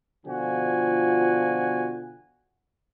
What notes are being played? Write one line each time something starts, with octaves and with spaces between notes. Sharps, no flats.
B2 D3 F3 F4 F#4 G#5